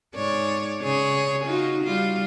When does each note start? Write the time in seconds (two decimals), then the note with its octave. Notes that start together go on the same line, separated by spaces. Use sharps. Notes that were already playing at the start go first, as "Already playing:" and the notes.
0.16 G#2 C#5 D5
0.83 C#3 G#4 C#5
1.45 D#4 F4 F#4
1.83 G3 F4